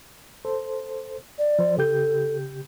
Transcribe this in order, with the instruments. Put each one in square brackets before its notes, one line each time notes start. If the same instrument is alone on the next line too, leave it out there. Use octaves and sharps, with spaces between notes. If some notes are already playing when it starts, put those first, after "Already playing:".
[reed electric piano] A4 C5
[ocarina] D5
[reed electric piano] F3 C5
[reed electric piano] C#3 G4 G6 [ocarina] A4